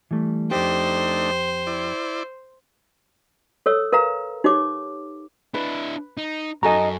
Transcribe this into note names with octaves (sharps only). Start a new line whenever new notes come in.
E3 G3 A3
F2 A3 D4 D#4 G4 C5
E4 D5
A4 C#5 E6
A#4 B4 F5 A#5
D#4 G4 C#5 D6
D4 E4 B4
D#4
F#2 F#4 A4 D#5 G#5 A#5